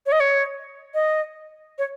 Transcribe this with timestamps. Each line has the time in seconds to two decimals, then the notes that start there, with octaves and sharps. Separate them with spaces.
0.06 C#5
0.12 D#5
0.20 C#5
0.94 D#5
1.78 C#5